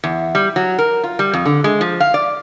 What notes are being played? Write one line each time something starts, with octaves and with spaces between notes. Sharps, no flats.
E2
G3
F#3
A#4
F4
G3
F2
D3
G#3
F3
F5
D5